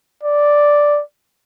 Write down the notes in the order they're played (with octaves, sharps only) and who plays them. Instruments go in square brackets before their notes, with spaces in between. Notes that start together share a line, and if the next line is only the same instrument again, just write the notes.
[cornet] D5